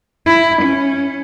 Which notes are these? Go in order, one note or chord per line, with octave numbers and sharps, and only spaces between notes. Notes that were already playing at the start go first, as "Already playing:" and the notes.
E4
C#4